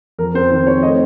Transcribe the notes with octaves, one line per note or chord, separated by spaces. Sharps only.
F2 A#4
C4 C5
D#3 C5
C4 C#5
A3 D#5